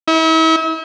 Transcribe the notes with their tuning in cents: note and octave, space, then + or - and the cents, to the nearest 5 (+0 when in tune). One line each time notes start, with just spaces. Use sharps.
E4 -40